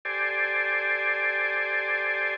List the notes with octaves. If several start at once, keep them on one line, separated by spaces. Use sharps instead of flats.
G4 A4 C5 D5 G#5